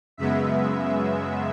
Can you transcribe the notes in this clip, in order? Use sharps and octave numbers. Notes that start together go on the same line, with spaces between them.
F#2 C#3 G#3 B3 E5